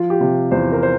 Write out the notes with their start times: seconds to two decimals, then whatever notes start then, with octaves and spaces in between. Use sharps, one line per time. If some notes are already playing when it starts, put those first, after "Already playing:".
Already playing: F3 F4
0.10 G4
0.20 C3
0.51 E2 C5
0.72 A#4
0.83 C5